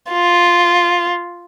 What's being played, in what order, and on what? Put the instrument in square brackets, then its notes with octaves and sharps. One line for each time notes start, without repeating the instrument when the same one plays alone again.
[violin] F4